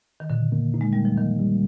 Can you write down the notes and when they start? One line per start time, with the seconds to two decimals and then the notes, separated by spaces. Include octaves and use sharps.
0.20 D#3
0.30 A#2 D3
0.52 A#3
0.74 D#4
0.81 G#3
0.93 G3 A#3
1.05 F3
1.17 D#3 A#3
1.39 G3